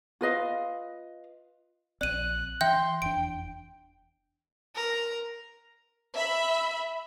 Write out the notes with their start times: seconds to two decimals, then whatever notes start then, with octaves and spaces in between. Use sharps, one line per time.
0.21 F4 B4 D#5 F5
2.01 A#1 C4 D5 F#6 D#7
2.61 E3 E5 G5 C6 G6
3.02 F1 E2 D4 G5 D7
4.76 A#4
6.15 E5 B5